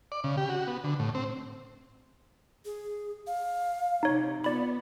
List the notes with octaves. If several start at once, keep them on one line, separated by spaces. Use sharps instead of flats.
D5
C#3
G4
F#4
B3
D3
A2
C4
G#4
F5
C3 D#4 C#5
B3 F4 D5 B5